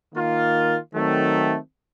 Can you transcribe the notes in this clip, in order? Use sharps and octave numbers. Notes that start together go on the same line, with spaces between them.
D#3 A#3 F4
D#3 F#3 A3 C4